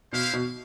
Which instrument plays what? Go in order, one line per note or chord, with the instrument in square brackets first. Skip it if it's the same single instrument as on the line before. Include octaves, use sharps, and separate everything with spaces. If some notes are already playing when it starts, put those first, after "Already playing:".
[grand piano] B2 [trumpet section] E4 G4 C5 F5
[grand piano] B2